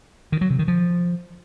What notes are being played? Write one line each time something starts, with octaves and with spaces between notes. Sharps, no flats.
D#3
F#3
C3
D#3
F3